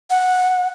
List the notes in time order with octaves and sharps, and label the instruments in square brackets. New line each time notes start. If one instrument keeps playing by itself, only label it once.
[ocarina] F#5